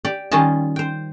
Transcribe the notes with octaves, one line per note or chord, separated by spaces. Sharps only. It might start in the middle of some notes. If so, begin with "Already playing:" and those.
G4 D5
D#3 G3 C#4 F4 D#5 A5
C5 G5